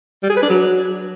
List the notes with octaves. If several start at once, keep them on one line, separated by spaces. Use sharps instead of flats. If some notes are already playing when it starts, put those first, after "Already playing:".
G3
G#4
B4
D4
F#3